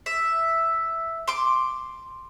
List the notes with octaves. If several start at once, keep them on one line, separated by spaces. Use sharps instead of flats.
E5
C6 D6